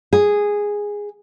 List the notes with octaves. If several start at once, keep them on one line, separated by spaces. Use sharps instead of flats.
G#4